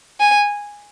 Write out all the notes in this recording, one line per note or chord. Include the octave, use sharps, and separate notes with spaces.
G#5